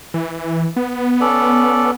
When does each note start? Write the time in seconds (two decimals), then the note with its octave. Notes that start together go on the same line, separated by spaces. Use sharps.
0.14 E3
0.76 B3
1.21 C#4 A4 D5